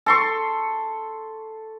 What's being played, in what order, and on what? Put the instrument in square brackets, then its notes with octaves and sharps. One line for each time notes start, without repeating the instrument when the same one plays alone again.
[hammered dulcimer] A4 C6 C#6